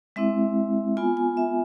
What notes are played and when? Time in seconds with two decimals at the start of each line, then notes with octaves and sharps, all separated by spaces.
0.16 G#3 C4 E4 E5
0.97 B3 F4 G#5
1.17 G#5
1.37 E5